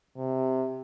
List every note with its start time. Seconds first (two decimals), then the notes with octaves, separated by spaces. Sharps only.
0.16 C3